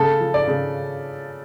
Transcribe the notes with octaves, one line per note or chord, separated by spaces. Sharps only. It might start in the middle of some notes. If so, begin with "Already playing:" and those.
Already playing: C#3 A4
F3
D5
C#3